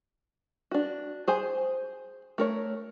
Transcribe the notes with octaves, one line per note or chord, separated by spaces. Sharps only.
D4 F#4
G#4 C5 G#5
A3 A#4 C#5